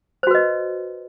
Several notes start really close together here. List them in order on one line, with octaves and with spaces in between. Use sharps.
C5 F#4 B4 D#5